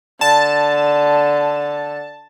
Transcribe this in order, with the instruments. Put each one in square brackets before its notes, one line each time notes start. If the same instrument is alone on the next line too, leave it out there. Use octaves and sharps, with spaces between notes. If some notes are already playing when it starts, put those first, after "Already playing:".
[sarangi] D3 [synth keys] A5